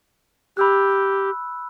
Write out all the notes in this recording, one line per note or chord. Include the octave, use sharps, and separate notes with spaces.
G4 B5 E6 F#6